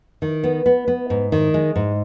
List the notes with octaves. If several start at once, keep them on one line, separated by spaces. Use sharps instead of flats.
D#3
B3
B3
B3
G#2
D#3
G#3
G#2